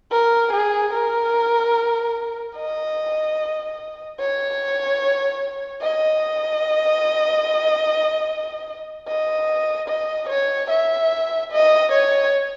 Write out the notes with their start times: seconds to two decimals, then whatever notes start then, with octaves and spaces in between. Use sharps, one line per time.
0.11 A#4
0.52 G#4
0.93 A#4
2.56 D#5
4.19 C#5
5.82 D#5
9.07 D#5
9.88 D#5
10.29 C#5
10.70 E5
11.51 D#5
11.92 C#5